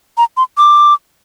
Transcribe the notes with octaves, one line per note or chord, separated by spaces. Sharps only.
A#5
C6
D6